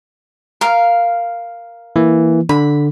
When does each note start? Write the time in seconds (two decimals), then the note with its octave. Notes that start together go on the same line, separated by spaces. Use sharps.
0.61 A#4 F5
1.96 E3 A#3
2.49 D3 B5